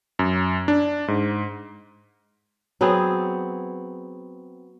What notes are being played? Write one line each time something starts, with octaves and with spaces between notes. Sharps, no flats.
F#2
D4
G#2
F#3 B3 C4 G#4